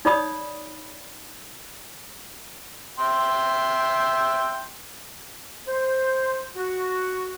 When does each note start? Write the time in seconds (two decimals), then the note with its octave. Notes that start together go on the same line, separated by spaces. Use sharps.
0.05 D#4 C#5 D5 B5 D#6
2.99 E5 G5 C6
5.67 C5
6.56 F#4